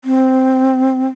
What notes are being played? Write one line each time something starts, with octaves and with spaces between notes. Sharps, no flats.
C4